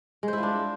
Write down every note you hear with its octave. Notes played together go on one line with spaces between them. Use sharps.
G#3
C5
E4
F4
D4